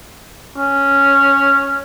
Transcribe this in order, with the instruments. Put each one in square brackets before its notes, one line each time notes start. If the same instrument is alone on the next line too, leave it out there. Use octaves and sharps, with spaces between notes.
[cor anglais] C#4